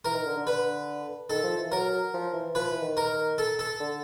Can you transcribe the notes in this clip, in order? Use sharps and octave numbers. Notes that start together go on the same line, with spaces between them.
E3 A#4
D#3
D3
D3
D3 B4
D#3 A4
F3
E3
F#3 A#4
F3
E3
F3 B4
E3
D#3
A#4
A4
A4
D3